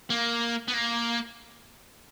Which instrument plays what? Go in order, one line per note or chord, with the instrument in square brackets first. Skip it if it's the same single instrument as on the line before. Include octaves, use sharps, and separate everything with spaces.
[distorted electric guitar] A#3
B3
A#3